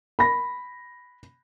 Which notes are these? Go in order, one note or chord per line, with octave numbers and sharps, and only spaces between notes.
B5 A#6